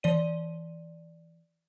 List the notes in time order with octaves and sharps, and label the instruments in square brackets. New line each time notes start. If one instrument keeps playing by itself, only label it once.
[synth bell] E3 D5 D#7